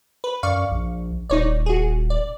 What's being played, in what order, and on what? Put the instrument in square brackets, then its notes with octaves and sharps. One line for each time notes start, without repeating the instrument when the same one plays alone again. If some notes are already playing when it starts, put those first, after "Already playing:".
[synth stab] B4
[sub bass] F#2 [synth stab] D5 F5 C#6
[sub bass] A#1
[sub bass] D#1 [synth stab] D#4 C#5 D5
[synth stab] F#4 G#4
D5